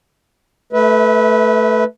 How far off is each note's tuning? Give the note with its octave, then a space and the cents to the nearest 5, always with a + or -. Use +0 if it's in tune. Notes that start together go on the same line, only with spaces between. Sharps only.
A3 +0 B4 +0 E5 -35